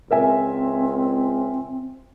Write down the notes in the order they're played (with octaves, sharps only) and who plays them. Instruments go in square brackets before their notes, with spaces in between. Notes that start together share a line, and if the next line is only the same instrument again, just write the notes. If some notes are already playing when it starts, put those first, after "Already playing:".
[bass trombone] C#2 [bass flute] C4 [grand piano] A#4 E5 G#5